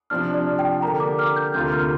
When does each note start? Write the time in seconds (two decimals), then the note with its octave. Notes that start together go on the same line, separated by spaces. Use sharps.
0.10 C3 F3 D4 F6
0.34 D5
0.59 G5
0.82 D3 A#3 G4 A#5
1.00 D6
1.19 F6
1.36 G6
1.54 D2 C3 A#3 F4 G6
1.72 F6